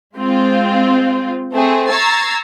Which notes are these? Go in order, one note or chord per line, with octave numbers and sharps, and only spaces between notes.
G#3 C4 F4
A3 C4 G#4
A#5 C#6 E6 G#6 A6 C7